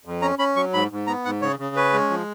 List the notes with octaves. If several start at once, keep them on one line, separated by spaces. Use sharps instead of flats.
F2
C#4 A#5
C#4 B5
F#3 C#6
G#2 B5
G#2
B3 A#5
G#2 F#5
C#3 C#5
C#3
C#4 B4
G#3
F3